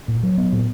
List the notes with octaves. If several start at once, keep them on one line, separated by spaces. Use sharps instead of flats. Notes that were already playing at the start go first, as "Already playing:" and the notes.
A#2
F#3
B3
A#2